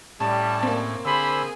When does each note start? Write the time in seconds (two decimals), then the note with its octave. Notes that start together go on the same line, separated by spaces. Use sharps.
0.20 A2 G3 C#4 A5
0.63 A#3 C4
1.05 D3 G#4 C5 B5 E6